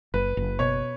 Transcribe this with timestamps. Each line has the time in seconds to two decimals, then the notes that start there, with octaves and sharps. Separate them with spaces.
0.14 F#1 B4
0.37 F#1
0.59 B2 C#5